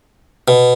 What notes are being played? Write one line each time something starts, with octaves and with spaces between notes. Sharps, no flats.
B2